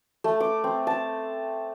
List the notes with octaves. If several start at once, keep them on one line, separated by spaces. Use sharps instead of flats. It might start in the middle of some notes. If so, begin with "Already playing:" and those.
A3
D6
C4
A5